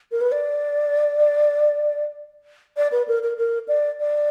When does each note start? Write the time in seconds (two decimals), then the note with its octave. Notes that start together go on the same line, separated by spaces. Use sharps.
0.12 A#4
0.21 B4
0.32 D5
2.77 D5
2.92 B4
3.08 A#4
3.23 A#4
3.37 A#4
3.68 D5
4.00 D5